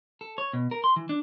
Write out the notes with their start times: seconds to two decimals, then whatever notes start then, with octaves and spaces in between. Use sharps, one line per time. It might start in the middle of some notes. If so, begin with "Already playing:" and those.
0.21 A4
0.38 C#5
0.53 B2
0.71 A#4
0.84 C6
0.96 E3
1.09 D4